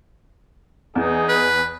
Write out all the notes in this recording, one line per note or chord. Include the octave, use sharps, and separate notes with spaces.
E2 E3 D#4 G#4
B4